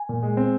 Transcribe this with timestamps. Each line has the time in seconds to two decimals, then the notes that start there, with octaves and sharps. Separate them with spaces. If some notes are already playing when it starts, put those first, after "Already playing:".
Already playing: G#5
0.09 A#2
0.23 G#3
0.37 C4